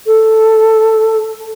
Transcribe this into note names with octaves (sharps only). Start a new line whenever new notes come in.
A4